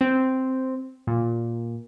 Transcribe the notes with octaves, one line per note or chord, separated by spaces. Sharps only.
C4
A#2